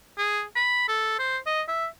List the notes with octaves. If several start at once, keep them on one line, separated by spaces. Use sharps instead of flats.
G#4
B5
A4
C5
D#5
E5